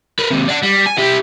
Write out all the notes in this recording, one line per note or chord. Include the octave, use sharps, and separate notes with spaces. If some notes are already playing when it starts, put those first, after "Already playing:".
A#4 B4
D#2 C3
D5 F#5
G3
G#5
E4 G4